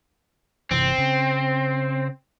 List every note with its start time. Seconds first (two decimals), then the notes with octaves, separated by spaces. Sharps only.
0.71 G1 C3 E3 C4
0.98 C#3